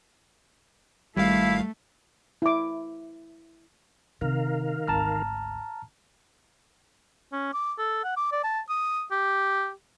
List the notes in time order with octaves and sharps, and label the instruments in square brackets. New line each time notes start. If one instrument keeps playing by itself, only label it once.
[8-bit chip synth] G#1 F5 [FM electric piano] G3 [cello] A3 [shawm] E4
[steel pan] E4 D6
[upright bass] C3 [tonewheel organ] D#3 A#4 F5
[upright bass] G#1 D2 [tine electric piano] A5 A#5 F6
[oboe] C#4
D6
A4
F#5
D6
D5
A5
D#6
G4